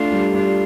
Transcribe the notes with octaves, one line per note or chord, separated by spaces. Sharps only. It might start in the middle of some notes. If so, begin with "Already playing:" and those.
Already playing: A3 D4 F4
G3
G3 D4 F4